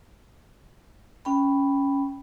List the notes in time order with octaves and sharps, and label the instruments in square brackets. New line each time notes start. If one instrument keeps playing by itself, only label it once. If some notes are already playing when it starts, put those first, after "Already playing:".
[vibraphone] C#4 G5 B5